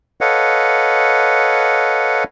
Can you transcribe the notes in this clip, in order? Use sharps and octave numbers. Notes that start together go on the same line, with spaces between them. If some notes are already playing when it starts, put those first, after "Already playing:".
A4 B4 C#5 D#5 F5 F#5